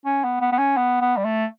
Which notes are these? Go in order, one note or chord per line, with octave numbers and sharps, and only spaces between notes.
C#4
B3
B3
B3
C#4
B3
B3
G3
A3